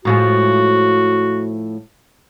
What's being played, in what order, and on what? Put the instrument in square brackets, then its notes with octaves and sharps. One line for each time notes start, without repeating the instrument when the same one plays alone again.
[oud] A2 F3 G#3 [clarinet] F#4